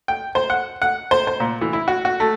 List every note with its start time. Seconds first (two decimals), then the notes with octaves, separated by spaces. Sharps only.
0.08 G5
0.35 C5
0.50 F#5
0.82 F#5
1.11 C5
1.27 C5
1.40 A#2
1.61 E3
1.73 E4
1.88 F#4
2.05 F#4
2.20 A3